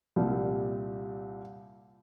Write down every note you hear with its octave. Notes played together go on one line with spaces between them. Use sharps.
C2 A#2 G3